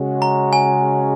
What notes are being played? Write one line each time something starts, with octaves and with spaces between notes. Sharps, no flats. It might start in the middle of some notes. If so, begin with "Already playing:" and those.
Already playing: C#3 G#3 C#4 F#4
A#5
G#5